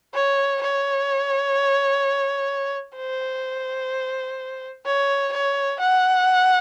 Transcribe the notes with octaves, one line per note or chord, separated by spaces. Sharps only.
C#5
C#5
C5
C#5
C#5
F#5